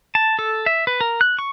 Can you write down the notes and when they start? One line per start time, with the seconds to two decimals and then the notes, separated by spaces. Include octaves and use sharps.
0.15 A5
0.39 A4
0.66 E5
0.87 B4
1.01 A#4
1.21 F#6
1.39 C#6